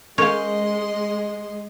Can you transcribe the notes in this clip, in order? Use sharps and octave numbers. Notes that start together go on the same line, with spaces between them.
G#3 C#4 A#4 C5 C#5 D#5 F5 C6